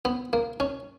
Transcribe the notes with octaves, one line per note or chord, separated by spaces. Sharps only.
B3
A#3
C#4